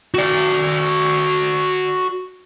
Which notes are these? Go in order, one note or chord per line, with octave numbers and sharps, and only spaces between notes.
F#4 D5